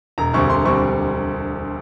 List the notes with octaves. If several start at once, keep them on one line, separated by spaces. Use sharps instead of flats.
E1 A#5
D2 D3 G3 C4 C#6
E1 C6
D2 D3 G3 C4 C#6